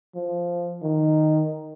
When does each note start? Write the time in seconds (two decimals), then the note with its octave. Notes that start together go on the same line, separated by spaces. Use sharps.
0.15 F3
0.83 D#3